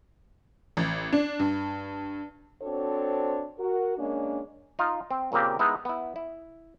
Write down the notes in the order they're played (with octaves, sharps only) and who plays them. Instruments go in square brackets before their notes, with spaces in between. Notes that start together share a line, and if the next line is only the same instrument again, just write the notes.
[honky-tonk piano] A1
D4
G2
[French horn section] C4 D4 F#4 A4 C5 C#5
F#4 A#4
G#3 A#3 C#4 D4
[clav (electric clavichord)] D#4 F4
C4
A#2 C#3 A#3 C4 G4
G#3 B3 D#4 E4
B3 E4
E4